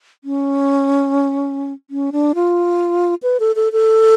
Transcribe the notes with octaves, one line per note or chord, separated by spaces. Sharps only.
C#4
C#4
D4
F4
B4
A4
A4
A4